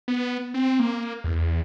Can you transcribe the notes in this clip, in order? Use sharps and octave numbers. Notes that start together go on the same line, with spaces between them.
B3
C4
A#3
E2